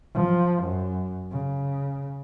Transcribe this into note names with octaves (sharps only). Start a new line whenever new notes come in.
F3
F#2
C#3